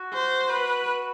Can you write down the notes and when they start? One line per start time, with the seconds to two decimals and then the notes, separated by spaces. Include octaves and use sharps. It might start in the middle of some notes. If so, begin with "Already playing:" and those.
Already playing: F#4
0.13 C5
0.50 B4